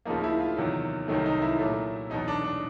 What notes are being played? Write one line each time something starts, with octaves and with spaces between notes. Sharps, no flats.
D2 C#3 F3 A#3 D#4
E4
F4
E2 C3 D#3 F#3
C2 C3 D#3 F#3 A3 D#4
D#4
E4
A#2 F#3 A3
E2 B2 F#3 D#4
D4
D4